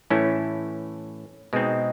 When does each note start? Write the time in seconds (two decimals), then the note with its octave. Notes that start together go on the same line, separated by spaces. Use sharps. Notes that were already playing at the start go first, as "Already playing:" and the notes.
0.10 A2 E3 A3 C#4 E4
1.53 B2 G#3 C4 D#4